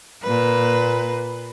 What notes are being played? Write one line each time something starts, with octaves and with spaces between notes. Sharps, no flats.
A#2 B4